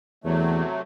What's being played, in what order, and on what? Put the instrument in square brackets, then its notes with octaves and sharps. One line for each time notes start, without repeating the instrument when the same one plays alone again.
[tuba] E2 [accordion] C3 F#3 A3 [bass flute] E3